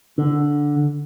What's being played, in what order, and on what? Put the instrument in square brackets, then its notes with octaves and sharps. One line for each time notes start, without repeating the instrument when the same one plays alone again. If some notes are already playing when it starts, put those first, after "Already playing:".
[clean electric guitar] D3